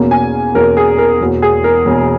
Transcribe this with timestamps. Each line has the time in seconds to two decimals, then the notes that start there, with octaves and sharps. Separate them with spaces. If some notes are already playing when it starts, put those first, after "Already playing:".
Already playing: E2 B2 A#3 C#4
0.11 G#5
0.54 E2 B2 A#3 C#4 A#4
0.77 G#4
0.98 A#4
1.21 E1 E2 B2 A#3
1.42 G#4
1.64 A#4
1.85 E1 E2 B2 A#3